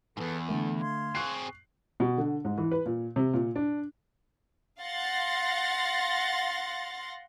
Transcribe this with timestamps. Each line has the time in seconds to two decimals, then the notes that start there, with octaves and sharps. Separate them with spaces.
0.17 E2 G#2 A4 B4
0.49 D3 A3 A4
0.80 F5 C6 G#6
1.15 C4 G#4 C#6 F#6 C7
2.00 B2
2.18 D3
2.45 G#2
2.58 E3
2.71 B4
2.86 A#2
3.16 C3
3.34 A#2
3.56 D4
4.80 F5 F#5 C6 A6 A#6